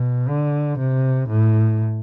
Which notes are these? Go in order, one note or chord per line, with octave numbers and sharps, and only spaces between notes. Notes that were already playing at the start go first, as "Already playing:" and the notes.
Already playing: B2
D3
C3
A2